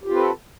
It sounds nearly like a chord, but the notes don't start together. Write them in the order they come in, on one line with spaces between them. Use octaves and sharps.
G4 F4 C4 B4 A4